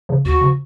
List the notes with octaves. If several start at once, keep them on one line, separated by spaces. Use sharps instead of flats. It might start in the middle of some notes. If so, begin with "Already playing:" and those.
C#3 F3
D#2 F#4
C#3 F3